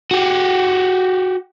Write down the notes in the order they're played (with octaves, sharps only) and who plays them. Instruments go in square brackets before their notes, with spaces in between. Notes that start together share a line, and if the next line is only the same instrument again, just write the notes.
[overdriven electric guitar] F#4 G4